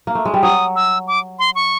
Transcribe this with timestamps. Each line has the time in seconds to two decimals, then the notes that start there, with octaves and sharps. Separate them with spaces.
0.07 A#3
0.15 A3
0.25 G#3
0.34 G3
0.43 F#3 D#6
0.76 E6
1.08 D6
1.39 C6
1.55 C#6